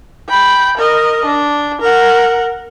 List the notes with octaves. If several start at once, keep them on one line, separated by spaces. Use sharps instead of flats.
G5 B5
A#4 D#5
D4
A#4 F#5